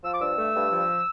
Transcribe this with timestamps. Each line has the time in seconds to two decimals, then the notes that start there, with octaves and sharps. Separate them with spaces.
0.03 F3 E6
0.13 D6
0.21 G2 E6
0.37 A3
0.55 G2
0.71 F3